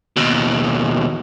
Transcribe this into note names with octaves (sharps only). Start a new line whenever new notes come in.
D#2 B2